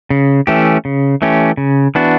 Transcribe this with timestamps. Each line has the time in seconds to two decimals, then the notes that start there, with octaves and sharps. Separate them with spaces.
0.10 C#3
0.47 E3 A3 C#4 G4
0.85 C#3
1.22 E3 A3 C#4 G4
1.57 C#3
1.95 E3 B3 D4 F#4